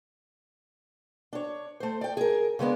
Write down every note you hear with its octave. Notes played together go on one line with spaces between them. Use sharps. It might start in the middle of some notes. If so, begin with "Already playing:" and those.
D4 C#5
A3 C5
D5 G5
G#4 A#4
C#3 G#3 B3 D4